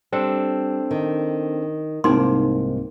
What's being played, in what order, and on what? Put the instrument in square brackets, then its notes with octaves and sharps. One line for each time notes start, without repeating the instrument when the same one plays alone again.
[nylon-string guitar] G3 [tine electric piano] C4 D4 A4
[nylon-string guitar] D#3
[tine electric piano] C2 G#2 [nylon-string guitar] A#3 C4 [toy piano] D#4 C6